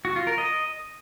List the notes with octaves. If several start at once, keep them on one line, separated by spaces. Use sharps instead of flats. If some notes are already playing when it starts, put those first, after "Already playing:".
F#4
F4
A#4
D#5